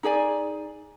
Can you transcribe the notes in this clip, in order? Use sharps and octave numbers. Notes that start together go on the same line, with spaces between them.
D#4 G#4 D5 G#5